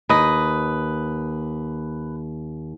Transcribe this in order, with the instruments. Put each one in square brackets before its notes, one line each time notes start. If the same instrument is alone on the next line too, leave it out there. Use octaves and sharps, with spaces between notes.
[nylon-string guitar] D#2 [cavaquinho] B4 D#5